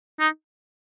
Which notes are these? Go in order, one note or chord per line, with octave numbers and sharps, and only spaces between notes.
D#4